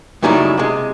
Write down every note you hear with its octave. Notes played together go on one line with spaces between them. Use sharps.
F#2 A2 C#3 G3 D#4 E4
C3 G#3